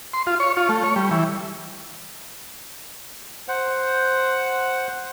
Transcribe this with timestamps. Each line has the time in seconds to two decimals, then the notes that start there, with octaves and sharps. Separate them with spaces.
0.13 C6
0.27 F4
0.40 C#5
0.57 F4
0.69 A3
0.83 C#5
0.96 G3
1.11 E3
3.48 C5 F#5